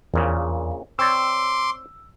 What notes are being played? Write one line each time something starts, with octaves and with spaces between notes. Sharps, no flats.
A#1 E2 A#2 C#3
C4 C#5 D5 C6 D6 E6